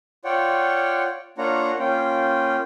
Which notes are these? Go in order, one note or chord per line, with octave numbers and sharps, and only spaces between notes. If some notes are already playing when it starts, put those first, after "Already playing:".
F4 C#5 D5 F#5 G5
A#3 D4 F4 C#5 F#5 A#5
A#3 C#4 F4 G5